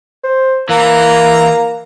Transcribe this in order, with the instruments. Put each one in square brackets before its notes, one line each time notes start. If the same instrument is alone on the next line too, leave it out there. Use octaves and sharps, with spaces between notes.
[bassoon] C5
[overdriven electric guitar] E3 [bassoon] A#3 [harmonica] A#5